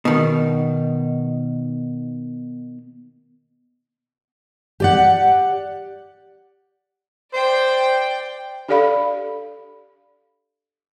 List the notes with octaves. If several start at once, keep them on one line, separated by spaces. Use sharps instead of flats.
B2 D#3
G4 D5 F#5
C5 D5 G5
D4 G4 A4 D5 F5 B5